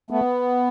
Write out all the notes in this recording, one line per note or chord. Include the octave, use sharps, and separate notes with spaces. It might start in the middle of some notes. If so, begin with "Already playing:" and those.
A3 B3